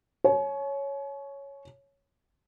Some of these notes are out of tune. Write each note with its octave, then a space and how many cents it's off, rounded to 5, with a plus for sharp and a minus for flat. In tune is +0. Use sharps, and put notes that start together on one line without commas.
C#5 +0 G#5 +45